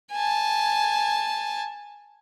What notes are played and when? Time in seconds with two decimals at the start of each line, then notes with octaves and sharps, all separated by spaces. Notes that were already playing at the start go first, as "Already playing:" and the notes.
0.12 G#5 A5